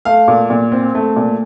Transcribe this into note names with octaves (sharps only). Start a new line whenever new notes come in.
A3 F5
A#2
A#2
C4
A3
A#2